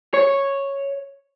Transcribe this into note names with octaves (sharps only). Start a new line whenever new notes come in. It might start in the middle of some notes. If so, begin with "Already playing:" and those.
C#5